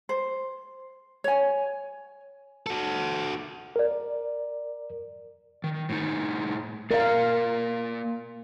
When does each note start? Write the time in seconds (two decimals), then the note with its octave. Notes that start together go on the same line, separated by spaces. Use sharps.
0.09 C5
1.24 C#5 G#5
2.67 F#4 A4
3.76 A#4 D5
5.64 D#3
5.89 A2 D#4
6.91 A#3 A#4 D5 F5